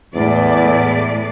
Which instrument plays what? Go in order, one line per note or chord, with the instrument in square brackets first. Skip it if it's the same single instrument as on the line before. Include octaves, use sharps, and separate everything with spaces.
[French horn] E2 [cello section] A2 D5